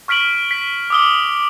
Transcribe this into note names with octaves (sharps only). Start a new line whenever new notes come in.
C#6 F6 B6 D7 F#7
B6
D6 D#6 G7